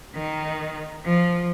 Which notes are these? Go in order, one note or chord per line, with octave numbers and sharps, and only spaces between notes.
D#3
F3